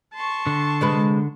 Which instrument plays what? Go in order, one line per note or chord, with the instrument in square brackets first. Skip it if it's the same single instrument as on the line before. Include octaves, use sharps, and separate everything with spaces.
[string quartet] A5 C6 C#6
[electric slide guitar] D3
[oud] C3 G#3 B4